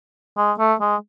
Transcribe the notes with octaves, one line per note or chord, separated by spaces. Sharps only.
G#3
A3
G#3